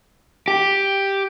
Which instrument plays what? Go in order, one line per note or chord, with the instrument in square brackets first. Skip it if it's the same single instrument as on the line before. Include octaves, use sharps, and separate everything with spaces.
[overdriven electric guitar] G4